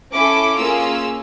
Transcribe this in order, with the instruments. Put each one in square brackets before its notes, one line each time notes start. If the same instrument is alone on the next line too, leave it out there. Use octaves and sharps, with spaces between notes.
[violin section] C#4 E4 A4 D6
A#3 C#4 F4 G#4 E6